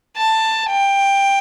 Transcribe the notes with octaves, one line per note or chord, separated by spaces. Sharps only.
A5
G5